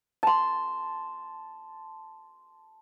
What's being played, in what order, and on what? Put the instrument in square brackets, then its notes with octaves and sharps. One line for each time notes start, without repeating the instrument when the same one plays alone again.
[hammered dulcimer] A5 C6